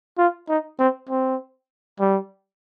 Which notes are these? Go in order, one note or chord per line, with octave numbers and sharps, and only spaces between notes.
F4
D#4
C4
C4
G3